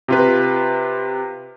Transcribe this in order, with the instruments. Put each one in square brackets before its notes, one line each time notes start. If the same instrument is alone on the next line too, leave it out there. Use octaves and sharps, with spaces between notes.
[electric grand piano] C3 F4 B4